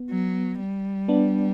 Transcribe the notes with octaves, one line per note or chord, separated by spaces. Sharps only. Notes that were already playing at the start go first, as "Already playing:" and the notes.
Already playing: B3
F#3
G3
B3 D4